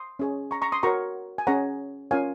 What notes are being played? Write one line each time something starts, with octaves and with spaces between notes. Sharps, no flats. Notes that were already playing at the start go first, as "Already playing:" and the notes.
Already playing: C6 D#6
C#4 G#4 C#5
A#5 C#6
A#5 C#6
C6 D#6
F#4 A#4 C#5 A#5 C#6
G#5
C#4 G#4 C#5 F#5 A#5
C#4 F4 A#4 C#5 F5 G#5